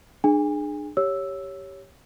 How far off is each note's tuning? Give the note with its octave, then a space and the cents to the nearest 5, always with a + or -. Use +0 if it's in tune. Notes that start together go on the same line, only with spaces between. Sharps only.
D4 +35 G#4 +10 G#5 -35
G4 +0 C#5 +0 E6 +0